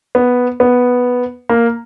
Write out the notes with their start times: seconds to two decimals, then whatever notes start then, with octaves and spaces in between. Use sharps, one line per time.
0.15 B3
0.60 B3
1.49 A#3